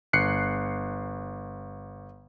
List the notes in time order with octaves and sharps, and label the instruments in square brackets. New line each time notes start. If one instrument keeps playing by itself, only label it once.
[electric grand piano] G1 F#6 C7 C#7